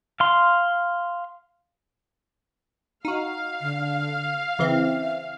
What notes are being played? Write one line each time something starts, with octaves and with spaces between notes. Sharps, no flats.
F5 C6
D#4 F#4 F5
D3
C#3 E3 C4 E5